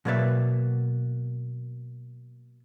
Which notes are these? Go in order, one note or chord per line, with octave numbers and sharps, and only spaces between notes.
B2 F#3 A#3 B4 D5 E5